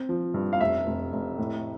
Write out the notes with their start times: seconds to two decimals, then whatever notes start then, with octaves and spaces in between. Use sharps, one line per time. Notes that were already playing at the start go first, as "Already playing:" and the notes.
Already playing: C4
0.09 F3
0.34 G2
0.53 F5
0.60 F1 E5
0.87 F1
1.13 F1
1.38 A2